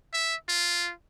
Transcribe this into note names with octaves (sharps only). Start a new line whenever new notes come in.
E5
F4